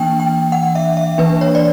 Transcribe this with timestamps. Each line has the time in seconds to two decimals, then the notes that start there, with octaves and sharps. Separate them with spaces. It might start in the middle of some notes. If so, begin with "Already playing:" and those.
Already playing: E3 A#3 D4 G5
0.20 G5
0.52 F#5
0.75 E5
0.97 E5
1.18 E3 A#3 D4 B4
1.41 C#5
1.55 D5